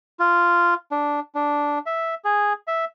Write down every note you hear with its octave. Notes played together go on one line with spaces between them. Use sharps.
F4
D4
D4
E5
G#4
E5